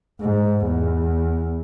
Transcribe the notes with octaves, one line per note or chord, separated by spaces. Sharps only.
G#2
E2